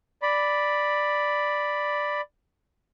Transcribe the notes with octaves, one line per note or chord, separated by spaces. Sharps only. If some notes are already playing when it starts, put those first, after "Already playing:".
D5 B5